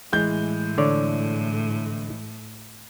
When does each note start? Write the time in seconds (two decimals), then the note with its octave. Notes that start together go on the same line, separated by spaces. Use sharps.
0.13 A2 E3 G#3 G6
0.78 D3 C#5 D5